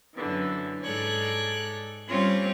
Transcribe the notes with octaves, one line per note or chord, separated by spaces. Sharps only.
F#2 D3 E3
G#2 A4 C#5 D5 F#6
G3 C4 C#4 F4 C#5